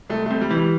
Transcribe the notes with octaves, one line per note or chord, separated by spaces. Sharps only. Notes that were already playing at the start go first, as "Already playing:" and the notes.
C2 A3
C3 A3
G3
E3
G3